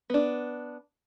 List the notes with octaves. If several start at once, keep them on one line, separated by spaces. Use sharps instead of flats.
B3 D4